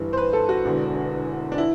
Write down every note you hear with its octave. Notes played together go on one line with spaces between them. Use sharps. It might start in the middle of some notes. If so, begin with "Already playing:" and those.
Already playing: G1 G2 E3
C5
B4
A4
F#4
E1 E2 D3
D4
E4